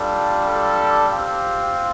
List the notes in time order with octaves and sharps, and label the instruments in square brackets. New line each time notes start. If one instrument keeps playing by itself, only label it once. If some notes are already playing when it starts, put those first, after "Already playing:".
Already playing: [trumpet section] G3 D4 F4 A4
A4
C4 F4 G4